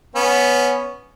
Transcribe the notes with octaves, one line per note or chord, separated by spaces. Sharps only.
B3 C#4